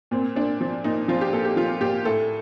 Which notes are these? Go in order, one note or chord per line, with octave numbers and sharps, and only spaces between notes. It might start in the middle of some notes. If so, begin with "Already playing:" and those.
A#2 C4
A#2 D4
F3
A#2 D#4
F3 F4
G4
A#2 A4
G4
F3 F4
A#2 G4
A2 A4